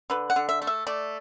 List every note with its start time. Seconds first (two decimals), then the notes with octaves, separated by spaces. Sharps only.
0.10 D3 B4
0.30 F#5
0.36 D3
0.49 E5
0.62 A3
0.67 E5
0.87 A3 D5